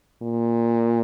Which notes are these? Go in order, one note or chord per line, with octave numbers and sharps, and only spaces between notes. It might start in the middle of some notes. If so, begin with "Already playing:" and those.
A#2